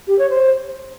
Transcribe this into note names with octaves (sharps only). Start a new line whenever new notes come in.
G4
C#5
C5